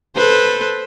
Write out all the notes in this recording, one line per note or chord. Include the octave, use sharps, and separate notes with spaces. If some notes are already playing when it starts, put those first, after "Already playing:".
A4 B4 C5